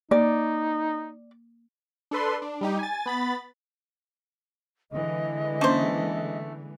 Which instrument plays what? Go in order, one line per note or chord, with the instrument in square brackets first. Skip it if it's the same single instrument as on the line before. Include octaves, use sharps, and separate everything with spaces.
[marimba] A#3 [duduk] D#4 [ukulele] D5
[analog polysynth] D4 A4 B4 C6
D4
G3 D#4 G4
G#5 A6
B3 B5 A6
[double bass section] D3 E3 G#3 [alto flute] D#5
[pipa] A3 C5 [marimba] A#3 C#4 D4